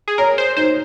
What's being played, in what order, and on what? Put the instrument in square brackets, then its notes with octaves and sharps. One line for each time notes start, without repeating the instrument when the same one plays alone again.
[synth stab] G#4
[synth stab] A#4 [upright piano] C#5
[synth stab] C5
[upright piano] D#4 [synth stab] C5